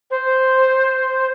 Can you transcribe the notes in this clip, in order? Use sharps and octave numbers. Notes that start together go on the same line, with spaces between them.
C5